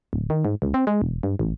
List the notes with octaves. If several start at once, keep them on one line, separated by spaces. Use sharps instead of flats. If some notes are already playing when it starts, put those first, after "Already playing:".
D1
D#3
G#2
C#2
C4
G#3
E1
G2
A1